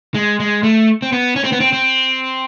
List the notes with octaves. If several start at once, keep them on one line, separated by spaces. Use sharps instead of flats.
G#3
G#3
A3
C4
B3
C#4
C4
B3
C4
C4